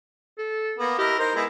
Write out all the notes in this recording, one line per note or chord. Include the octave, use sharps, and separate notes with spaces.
A4
A#3 B3
E4 G4 A#4 D#5
D#4 A#4 C5
G#3 B3 E4